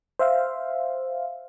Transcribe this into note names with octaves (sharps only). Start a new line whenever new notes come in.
C5 E5 F5